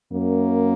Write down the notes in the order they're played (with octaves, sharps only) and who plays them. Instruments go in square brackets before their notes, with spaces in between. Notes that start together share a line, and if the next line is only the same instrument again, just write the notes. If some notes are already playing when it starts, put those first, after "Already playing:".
[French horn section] F#2 [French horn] A#3